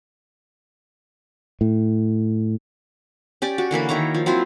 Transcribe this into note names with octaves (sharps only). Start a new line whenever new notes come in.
A2
C#4 G4 D5
F#4
D3 E3 A#3 B4
D#3 E4 C#5 A#5
F3
F#3 C4 E4 F4